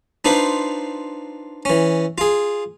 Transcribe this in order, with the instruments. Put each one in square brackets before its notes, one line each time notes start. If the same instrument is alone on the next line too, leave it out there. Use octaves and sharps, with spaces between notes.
[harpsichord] D4 D#4 F4 B4 C5
E3 C#4
F4 G#4